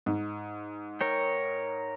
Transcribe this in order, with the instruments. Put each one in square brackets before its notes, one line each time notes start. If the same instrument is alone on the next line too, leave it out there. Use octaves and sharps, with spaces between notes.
[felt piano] G#2
[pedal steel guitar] A#4 C#5 G5